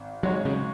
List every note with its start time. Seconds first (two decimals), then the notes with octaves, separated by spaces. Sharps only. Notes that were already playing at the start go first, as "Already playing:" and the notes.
Already playing: G#1
0.23 G#2 F#3 G#3 F#4 C#5
0.45 C#3